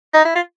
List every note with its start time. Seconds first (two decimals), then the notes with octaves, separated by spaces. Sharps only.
0.14 D#4
0.25 E4
0.35 F4